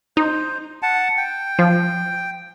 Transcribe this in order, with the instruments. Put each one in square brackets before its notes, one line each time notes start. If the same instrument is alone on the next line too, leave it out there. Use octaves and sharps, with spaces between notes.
[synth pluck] D#4 [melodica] C5
[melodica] F#5 A5
G5
[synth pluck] F3